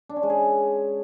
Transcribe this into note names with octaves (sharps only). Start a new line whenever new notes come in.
D4
C#4
G#3
G#4